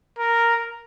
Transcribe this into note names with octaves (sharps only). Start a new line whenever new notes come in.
A#4